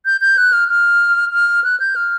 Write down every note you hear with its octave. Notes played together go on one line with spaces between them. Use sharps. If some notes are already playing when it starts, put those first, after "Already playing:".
G6
G6
F#6
F6
F6
F6
F#6
G6
F6